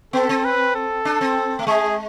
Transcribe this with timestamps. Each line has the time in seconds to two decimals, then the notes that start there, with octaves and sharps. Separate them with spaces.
0.13 B3 A4
0.29 C4
0.45 B4
0.75 A4
1.05 D4
1.21 C4
1.59 A3
1.67 G#3 G#4